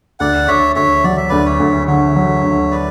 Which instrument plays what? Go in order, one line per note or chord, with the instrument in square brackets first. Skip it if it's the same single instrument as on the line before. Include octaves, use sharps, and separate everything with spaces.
[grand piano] D2 [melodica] D5 F#5
[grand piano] D2 [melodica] C#5 E5
[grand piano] D2 [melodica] C#5 E5
[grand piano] F#3 [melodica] D5
[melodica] E5
[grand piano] D2 [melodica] B4 D5
[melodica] C#5 E5
[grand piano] D2
[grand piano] D3 [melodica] C#5 E5
[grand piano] F#3
D2
[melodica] B4 D5